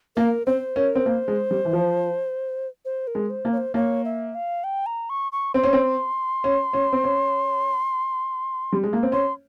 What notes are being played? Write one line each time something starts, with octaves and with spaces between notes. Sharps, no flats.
A#3 A#4
C4 C5
C#4 A#4
C4
A#3 C5
G#3
G3
E3
F3
C5
A#4
G#3
C5
A#3
C#5
C5
A#3 C#5
E5
F5
G5
A#5
C#6
C#6
C4 C6
C#4
C4
C#4
C#4
C4
C#4
G3
G#3
A#3
C4
C#4 C6